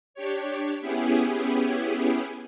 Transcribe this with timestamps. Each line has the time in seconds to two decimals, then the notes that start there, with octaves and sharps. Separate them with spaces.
0.14 D4 G4 C#5
0.81 B3 C#4 E4 G4 G#4